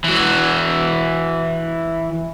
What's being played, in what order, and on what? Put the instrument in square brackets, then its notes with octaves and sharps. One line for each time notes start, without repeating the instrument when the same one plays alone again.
[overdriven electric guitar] E3 F#4